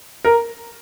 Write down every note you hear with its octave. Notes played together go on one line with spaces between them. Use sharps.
A#4